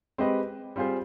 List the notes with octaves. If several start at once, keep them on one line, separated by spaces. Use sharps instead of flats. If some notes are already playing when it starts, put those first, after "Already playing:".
G#3 C4 G4 B4 D#5
G3 C4 F4 G#4 C5